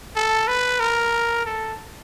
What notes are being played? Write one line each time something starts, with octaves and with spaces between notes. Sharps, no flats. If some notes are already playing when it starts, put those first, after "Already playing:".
A4
B4
A#4
A4